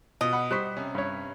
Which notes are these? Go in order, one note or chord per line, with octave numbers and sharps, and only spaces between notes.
B2 F4 D#5
F#5 B5
G3 C5 C#6 F#6 B6
C3 C#4
G2 C#5